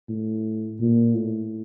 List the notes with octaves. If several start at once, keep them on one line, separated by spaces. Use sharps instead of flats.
A2
A#2
A2